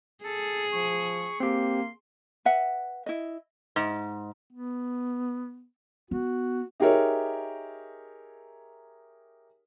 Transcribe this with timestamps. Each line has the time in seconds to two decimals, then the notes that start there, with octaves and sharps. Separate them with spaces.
0.24 G#4 A4
0.72 F3 C#6
1.40 A#3 C4 G4 C6
2.45 B4 E5 F#5
3.06 E4 D#5
3.76 G#2
4.53 B3
6.11 B3 F#4
6.80 D#4 G4 G#4 A#4 C#5 E5